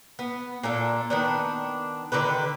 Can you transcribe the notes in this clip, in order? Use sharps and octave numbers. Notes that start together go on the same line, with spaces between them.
B3
A#2 D4 A4
D#3 B3 D4
D3 D#3 G4 B4